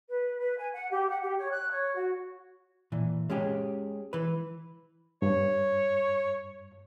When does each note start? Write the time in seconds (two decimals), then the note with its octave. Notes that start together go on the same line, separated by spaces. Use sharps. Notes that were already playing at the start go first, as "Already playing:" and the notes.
0.09 B4
0.39 B4
0.57 G#5
0.73 F#5
0.91 G4
1.10 F#5
1.22 G4
1.38 C#5
1.52 F#6
1.71 C#5
1.95 F#4
2.92 A#2 E3
3.30 G#3 C#4 G4 G#4
4.13 E3 B4
5.22 G2 C#5